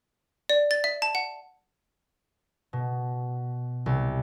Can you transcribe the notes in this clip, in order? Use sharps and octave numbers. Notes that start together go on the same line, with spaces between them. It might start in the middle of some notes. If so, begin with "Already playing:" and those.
D5
A6
E5
A5
F#5
B2
C2